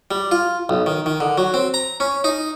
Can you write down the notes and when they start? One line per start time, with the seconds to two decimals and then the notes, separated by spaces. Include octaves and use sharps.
0.11 G3
0.31 F4
0.69 B1
0.86 D#3
1.06 D#3
1.20 D3
1.38 F#3
1.54 C4
1.74 A#5
2.00 C#4
2.24 D#4